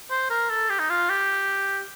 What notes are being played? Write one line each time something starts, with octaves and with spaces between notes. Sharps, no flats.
C5
A#4
A4
G4
D#4
F4
G4